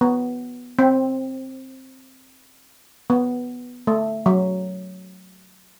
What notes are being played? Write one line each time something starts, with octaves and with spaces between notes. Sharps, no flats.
B3
C4
B3
A3
F#3